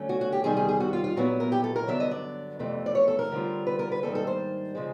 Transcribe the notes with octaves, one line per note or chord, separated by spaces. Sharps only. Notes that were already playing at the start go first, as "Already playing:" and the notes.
Already playing: D3 F#3 A3 C#4
F#4
F#4
G4
E2 C3 D#3 G3 G#4
G#4
G#4
F#4
F4
F4
A#2 F#3 B3 E4 F#4
A#4
G4
A4
A#4
G2 D3 F#3 B3 D4 E5
D#5
D5
F2 C3 E3 A3
D5
C#5
A4
A#4
D3 G3 C4 F4
B4
A#4
B4
G#2 D#3 G3 A#3 D4 A4
A4
C5
C#3 F3 G#3